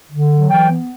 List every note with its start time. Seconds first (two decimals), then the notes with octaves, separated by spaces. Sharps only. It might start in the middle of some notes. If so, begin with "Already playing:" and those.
0.11 D3
0.30 F#3
0.50 E3 G5
0.69 B3